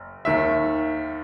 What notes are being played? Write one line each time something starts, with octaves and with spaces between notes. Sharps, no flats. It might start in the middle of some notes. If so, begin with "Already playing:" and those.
Already playing: F#1
D#2 D#3 E5